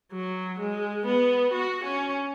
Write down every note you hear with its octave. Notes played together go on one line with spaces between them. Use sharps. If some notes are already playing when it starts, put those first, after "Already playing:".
F#3
G#3
B3
F#4
C#4